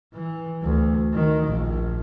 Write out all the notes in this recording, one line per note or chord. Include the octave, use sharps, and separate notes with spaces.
E3
D2
D#3
A#1